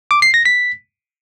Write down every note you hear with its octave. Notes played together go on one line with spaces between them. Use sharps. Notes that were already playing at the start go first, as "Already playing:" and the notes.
D6
C7
A#6
B6